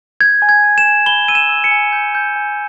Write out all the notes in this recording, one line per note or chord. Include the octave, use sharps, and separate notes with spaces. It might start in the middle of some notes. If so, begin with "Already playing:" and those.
G6 G#6
G#5
G#6
G#5
E7
G#5
B5 G7
E6 D#7
E7
E6
C#7
G#5
G6
G6
G#5